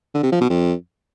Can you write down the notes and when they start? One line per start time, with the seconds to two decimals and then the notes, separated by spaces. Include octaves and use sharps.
0.14 D3
0.23 C3
0.32 F3
0.41 B2
0.50 F2